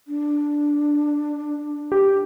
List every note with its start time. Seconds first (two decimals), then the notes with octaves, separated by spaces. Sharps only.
0.08 D4
1.92 G4